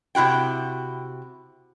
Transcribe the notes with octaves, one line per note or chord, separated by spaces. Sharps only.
C3 E4 F#4 G5